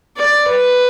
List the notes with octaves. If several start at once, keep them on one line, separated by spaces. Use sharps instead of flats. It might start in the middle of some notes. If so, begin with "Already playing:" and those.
D5
B4